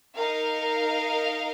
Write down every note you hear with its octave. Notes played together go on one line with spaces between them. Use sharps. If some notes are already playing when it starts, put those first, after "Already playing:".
D#4 A#4 F5